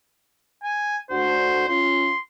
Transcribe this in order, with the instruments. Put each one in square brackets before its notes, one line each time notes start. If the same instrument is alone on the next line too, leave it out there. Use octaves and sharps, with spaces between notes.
[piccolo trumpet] G#5
[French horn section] D2 D4 F#4 [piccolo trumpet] C5
[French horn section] C#4 F4 [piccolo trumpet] C6